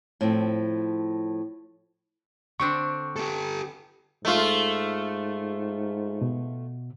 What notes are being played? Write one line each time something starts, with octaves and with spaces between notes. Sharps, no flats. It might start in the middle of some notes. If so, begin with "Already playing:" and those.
A2 F3 C4
D3 C4 D4 C#6
G4 A4
G#2 A3 F4
B2